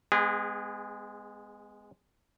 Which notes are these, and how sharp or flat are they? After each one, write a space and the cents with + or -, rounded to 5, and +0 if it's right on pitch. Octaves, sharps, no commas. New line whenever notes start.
G#3 +0 B3 +35 G#4 -35